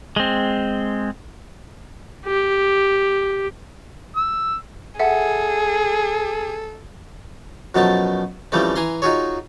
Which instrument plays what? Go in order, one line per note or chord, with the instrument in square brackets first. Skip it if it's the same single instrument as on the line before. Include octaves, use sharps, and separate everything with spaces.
[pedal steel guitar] G#3 C4
[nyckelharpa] G4
[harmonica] E6
[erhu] G#4 [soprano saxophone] A4 [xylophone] E5 F#5
[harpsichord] F#2 B2 F3 F#3 A3 A5
C#3 E3 F3 G3 A3 C4
E3 G#5 A#5 C6
D#4 F4 F#4 G#4 C#5